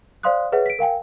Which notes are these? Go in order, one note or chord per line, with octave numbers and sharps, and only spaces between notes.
C5 D5 F5 C6 D#6 F#6
G#4 B4 C#5 E5 F#5
B6 D7
A#4 F5 G5 G#5